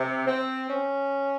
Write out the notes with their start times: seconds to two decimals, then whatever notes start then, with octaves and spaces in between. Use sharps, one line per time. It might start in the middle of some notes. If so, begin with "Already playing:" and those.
Already playing: C3
0.27 C4
0.70 C#4